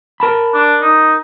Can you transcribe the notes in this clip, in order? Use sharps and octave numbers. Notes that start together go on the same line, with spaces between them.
A#4 A5 B5
D4
D#4